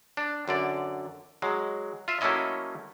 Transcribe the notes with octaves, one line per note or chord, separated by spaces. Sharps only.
D4
F#2 D3 D5
F#3 G#3
F4 E5
F#3 A3 A#3 C#4 E4 D#5